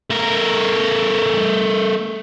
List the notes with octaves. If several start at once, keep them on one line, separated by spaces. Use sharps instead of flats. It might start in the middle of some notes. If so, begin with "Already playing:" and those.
A3 A#4